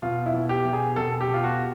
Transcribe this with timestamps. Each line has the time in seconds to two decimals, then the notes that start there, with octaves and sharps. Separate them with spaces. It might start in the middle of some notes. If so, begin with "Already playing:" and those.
0.02 B2 F4
0.26 E4
0.34 B2
0.49 G4
0.65 B2
0.73 G#4
0.96 B2 A4
1.21 G4
1.28 B2
1.34 F4
1.44 F#4